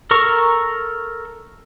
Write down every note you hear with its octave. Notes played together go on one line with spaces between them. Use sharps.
A4 A#4 C#6